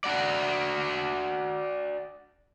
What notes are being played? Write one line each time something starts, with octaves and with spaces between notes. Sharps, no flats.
D4 F#4 D5